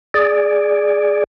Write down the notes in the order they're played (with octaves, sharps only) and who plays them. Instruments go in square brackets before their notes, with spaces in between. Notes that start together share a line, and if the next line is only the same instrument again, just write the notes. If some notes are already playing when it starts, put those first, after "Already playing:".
[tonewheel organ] G#4 D5